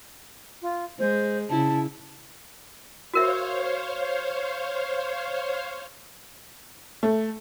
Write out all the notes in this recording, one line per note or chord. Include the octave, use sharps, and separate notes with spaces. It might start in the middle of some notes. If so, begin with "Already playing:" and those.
F4
G#3 C5
C#3 E4 A5
F#4 A#4 C5 C#5 E5 F5
A3